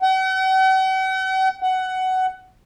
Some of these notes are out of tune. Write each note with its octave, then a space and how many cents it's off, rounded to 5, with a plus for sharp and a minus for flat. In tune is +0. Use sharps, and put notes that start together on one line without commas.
F#5 +45
F#5 +15